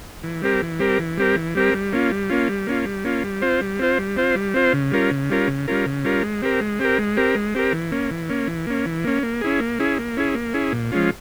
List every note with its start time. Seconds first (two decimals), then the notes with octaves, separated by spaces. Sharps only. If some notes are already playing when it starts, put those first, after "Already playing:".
0.23 E3
0.42 G3 C4 G4 A#4
0.62 E3
0.79 G3 C4 G4 A#4
0.99 E3
1.17 G3 C4 G4 A#4
1.36 E3
1.55 G3 C4 G4 A#4
1.74 G3
1.93 A#3 C#4 F4
2.11 G3
2.30 A#3 C#4 F4
2.49 G3
2.67 A#3 C#4 F4
2.85 G3
3.05 A#3 C#4 F4
3.24 G3
3.42 C4 F4 C5
3.61 G3
3.79 C4 F4 C5
3.98 G3
4.17 C4 F4 C5
4.35 G3
4.54 C4 F4 C5
4.73 C#3
4.92 G3 C#4 F4 A#4
5.11 C#3
5.30 G3 C#4 F4 A#4
5.48 C#3
5.68 G3 C#4 F4 A#4
5.86 C#3
6.04 G3 C#4 F4 A#4
6.23 G#3
6.42 C4 G4 A#4
6.61 G#3
6.79 C4 G4 A#4
6.98 G#3
7.17 C4 G4 A#4
7.35 G#3
7.55 C4 G4 A#4
7.73 E3
7.92 A#3 C#4
8.11 E3
8.29 A#3 C#4
8.47 E3
8.67 A#3 C#4
8.86 E3
9.04 A#3 C#4
9.23 A#3
9.41 C#4 E4 G#4
9.60 A#3
9.79 C#4 E4 G#4
9.98 A#3
10.17 C#4 E4 G#4
10.35 A#3
10.54 C#4 E4 G#4
10.72 A#2
10.92 F3 G#3 C#4 F4